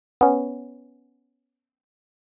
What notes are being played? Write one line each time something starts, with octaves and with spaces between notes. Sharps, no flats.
B3 C#4